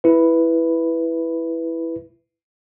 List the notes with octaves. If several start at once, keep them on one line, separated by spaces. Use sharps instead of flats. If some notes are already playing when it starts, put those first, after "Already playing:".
E4 B4